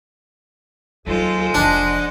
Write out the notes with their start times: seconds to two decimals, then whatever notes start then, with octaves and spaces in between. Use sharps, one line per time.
1.07 D#2 F#3 G#3 F4 A4 C5
1.54 F1 F3 D4 D#5 F#5